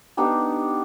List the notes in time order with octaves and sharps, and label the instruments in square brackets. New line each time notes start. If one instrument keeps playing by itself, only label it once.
[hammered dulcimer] B3 D4 D#4 G4